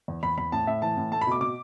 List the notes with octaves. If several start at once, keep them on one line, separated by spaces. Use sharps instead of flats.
E2
E2 B5
E2 B5
A2 A5
A2 E5
E3 A5
A2
A3 A5
B5
B2 D6
B2 D6